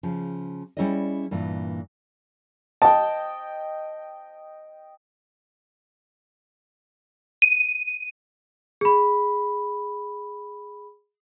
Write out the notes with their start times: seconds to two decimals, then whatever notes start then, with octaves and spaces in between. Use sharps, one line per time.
0.03 C#3 F3
0.77 G3 C#4 E4 G#4 D5 D#5
1.31 G2 A#2 E3
2.82 D#5 G5 A5
7.42 D#7
8.81 G#4 B5